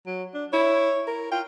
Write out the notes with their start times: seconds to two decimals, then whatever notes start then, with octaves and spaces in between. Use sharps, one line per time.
0.07 F#3
0.34 D4
0.53 E4 C#5
1.07 A#4
1.31 F4 G5